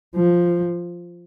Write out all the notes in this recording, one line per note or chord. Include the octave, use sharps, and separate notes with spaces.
F3